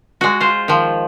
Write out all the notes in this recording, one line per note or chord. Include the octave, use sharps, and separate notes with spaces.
G#3 F#4
F4 C5
D#3 F3